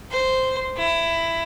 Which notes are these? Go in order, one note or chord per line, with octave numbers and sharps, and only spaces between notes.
C5
E4